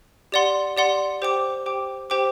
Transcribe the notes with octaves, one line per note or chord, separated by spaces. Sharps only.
G4 D5 F#5 C6
G4 D5 F#5 C6
G4 C5 G5 D6
G4 C5 G5 D6
G4 C5 G5 D6